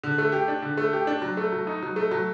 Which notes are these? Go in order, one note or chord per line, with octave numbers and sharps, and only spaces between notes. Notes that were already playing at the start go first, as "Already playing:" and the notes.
D3
A3
G4
D4
D3
A3
G4
D4
F#3
A3
F#3
D#4
F#3
A3
F#3